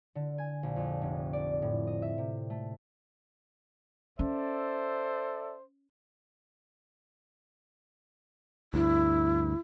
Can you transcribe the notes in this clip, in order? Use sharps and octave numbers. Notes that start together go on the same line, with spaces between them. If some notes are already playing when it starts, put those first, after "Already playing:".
D3
G#5
A#1
F2
F1
D5
A2
D#5
E5
C3
A3
C#4 A4 C5 D5 E5
D2 G2 E4